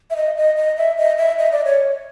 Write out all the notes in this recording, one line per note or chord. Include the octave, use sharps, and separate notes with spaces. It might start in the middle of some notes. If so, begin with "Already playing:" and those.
E5
D#5
D#5
D#5
E5
D#5
E5
D#5
D5
C#5